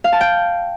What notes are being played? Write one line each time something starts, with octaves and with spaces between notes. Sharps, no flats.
F5
A5
G5